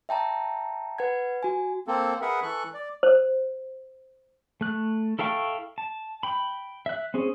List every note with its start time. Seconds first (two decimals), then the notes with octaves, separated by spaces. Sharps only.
0.09 E5 G5 A5 A#5
0.98 B4 F#5 G#6
1.43 F#4 G#5
1.88 A#3 C4 A4
2.22 G#4 A#4 B4 E5 F#5
2.43 E3 A4 C#6 F#6
2.74 D5
3.03 C5
4.61 A3 F#6
5.19 E4 A4 F5 G5 C#6
5.78 A5
6.23 G5 B5
6.86 E5 F#6
7.14 C4 C#4 G#4